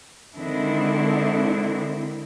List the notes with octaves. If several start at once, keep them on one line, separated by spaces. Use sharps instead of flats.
D3 D#3 G#3 C4 D4 E4